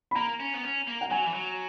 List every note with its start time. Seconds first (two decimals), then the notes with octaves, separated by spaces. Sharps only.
0.11 B5
0.15 A#3 A#5
0.40 C#4
0.54 B3
0.63 C#4
0.87 A#3
1.01 F#5
1.10 F#3 G#5
1.26 E3
1.34 F#3